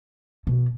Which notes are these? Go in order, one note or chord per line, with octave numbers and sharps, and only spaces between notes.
B2